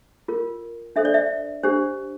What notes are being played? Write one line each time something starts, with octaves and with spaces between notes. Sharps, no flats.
F4 A#4
D4 A4 C5 E5
D5
E5
D4 G4 C5